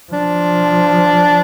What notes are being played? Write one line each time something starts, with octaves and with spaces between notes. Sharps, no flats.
F3 D4